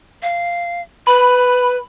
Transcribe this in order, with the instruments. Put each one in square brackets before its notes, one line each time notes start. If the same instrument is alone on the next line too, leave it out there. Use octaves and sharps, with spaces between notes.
[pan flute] F5
[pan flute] B4 [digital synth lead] B5